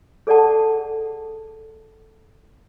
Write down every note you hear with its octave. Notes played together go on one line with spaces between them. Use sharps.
G#4 A4 D5 F#5 A5